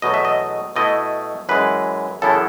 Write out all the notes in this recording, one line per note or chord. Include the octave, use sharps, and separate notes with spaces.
E2 B2 F#3 A3 D#5
E5
D#5
B2 A3 E4 D#5
F#2 E3 G#3 B4
F#2 C#3 E3 B3 E4 A4